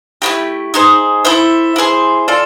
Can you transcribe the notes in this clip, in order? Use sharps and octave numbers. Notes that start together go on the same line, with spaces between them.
A3 C#4 E4 G4
D#4 G#4 C5
E4 A4 C5 E5
E4 G#4 C5
F4 A4 D5